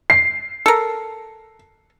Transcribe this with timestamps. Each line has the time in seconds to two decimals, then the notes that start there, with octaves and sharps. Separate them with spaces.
0.10 C7
0.66 A4 A#4